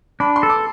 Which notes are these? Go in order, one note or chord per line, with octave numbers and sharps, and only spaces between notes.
D4 B5
C6
A4
D6